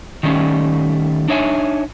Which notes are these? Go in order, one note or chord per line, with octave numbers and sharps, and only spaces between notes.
D#3 G3 A3 C#4
D4 D#4 C#5 E5 G5 G#5